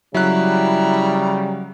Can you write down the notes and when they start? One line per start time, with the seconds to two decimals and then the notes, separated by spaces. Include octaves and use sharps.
0.14 C#3 F#3 G3 E4 A#5 F#6